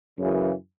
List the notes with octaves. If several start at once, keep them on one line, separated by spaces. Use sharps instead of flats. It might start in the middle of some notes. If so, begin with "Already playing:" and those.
F#2 C#3 E3